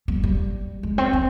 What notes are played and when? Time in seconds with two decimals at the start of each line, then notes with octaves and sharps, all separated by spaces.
0.08 G3
0.23 G3
0.83 G#3
0.98 C4
1.13 C4